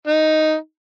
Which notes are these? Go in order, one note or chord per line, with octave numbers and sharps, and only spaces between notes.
D#4